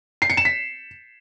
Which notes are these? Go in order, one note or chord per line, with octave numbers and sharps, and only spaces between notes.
C7
C#7
E7
B6